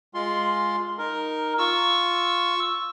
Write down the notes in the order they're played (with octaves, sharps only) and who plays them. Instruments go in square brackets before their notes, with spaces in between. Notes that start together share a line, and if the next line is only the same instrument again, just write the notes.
[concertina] G#3 F4 C6
D#4 A#4
[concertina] F4 [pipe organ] C#6 E6